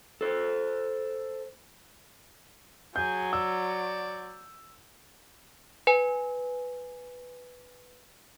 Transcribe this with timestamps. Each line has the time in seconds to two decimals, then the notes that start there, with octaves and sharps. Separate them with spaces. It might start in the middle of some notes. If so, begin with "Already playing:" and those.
0.21 A4 C5
2.96 F#3 G#4 G6
3.33 D5 E6
5.87 B4 G#5